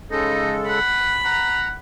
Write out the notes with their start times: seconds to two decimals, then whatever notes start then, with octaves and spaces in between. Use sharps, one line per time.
0.11 C#3 G#3 D#4 A4
0.68 F#5 B5
1.25 F#5 A#5